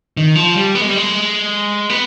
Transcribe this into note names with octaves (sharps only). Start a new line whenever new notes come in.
D#3
F3
G3
B3
G#3
G3
G#3
B3